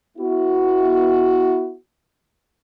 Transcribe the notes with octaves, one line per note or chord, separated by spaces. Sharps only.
B3 E4 F#4